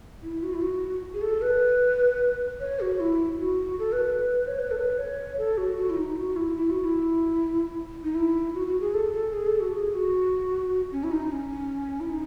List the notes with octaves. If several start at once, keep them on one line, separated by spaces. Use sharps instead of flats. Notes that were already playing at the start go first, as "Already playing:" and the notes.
E4
F#4
E4
F#4
G#4
A4
B4
C#5
F#4
E4
F#4
A4
B4
B4
C#5
B4
A4
B4
C#5
A4
F#4
F#4
E4
D#4
F#4
E4
E4
F#4
E4
D#4
E4
F#4
F#4
G#4
A4
A4
G#4
A4
F#4
G#4
F#4
C#4
E4
D#4
C#4
E4
D#4